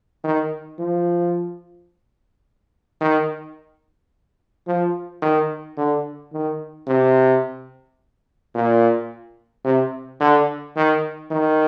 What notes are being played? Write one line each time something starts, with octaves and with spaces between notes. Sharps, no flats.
D#3
F3
D#3
F3
D#3
D3
D#3
C3
A#2
C3
D3
D#3
D#3